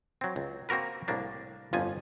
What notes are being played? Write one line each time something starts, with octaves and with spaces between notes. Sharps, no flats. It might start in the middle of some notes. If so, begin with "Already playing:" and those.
F#3 C4
C#2
A#3 C4 F#4 A#4 B4
C2 A2 A#3 D4
G1 F2 F3 G#5